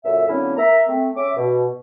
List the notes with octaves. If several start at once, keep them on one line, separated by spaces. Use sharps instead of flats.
F#2 A#2 A4 E5
D3 F#3 A#3 C4 C#4 E4
A#4 E5 A#5
A3 C4
C#4 E5 D6
B2